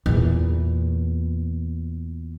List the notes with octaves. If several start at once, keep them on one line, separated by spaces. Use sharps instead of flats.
E2 A#2